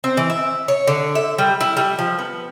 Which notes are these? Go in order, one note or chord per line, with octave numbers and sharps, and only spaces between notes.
C4
E3
E5
C#5
D3
E5
G3
E4
G3
F3
B3